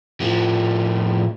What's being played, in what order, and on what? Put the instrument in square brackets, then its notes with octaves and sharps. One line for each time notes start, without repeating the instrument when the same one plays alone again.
[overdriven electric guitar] A2 F3